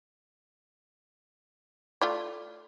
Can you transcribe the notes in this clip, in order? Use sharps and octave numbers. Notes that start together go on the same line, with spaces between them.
A3 F4 D5